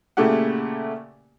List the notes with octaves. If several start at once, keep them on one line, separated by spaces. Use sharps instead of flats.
A#2 C#3 A3 E4 G4 F#5